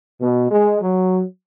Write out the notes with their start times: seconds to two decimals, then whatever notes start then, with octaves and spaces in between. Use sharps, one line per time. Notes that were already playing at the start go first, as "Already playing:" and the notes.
0.21 B2
0.51 G#3
0.82 F#3